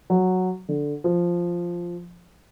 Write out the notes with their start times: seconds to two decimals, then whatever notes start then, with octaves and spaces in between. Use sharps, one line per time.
0.10 F#3
0.69 D3
1.04 F3